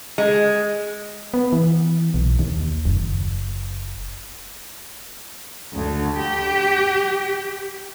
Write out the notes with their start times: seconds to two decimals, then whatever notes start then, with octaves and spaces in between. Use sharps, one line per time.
0.18 G#3
1.34 B3
1.53 E3
2.14 B1
2.39 D#2
2.85 F#1
5.74 D2
6.19 G4